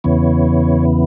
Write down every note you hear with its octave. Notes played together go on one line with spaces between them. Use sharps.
E2 C#3 E3 B3 C#5